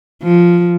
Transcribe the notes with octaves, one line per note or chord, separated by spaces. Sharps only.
F3